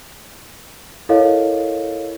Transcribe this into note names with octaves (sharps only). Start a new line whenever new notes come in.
E4 A4 A#4 C#5 D#5 F5